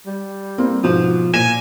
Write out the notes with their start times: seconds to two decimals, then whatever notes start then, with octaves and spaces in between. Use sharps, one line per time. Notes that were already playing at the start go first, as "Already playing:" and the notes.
0.06 G3
0.58 A#3 C4
0.84 G#2 B2 F3
1.34 A#2 G#5 A#6 E7